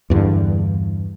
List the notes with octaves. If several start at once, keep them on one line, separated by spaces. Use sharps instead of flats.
E2 G2 D3